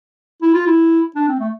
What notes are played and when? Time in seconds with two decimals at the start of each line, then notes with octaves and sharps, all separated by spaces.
0.42 E4
0.54 F4
0.67 E4
1.15 D4
1.28 C4
1.39 A3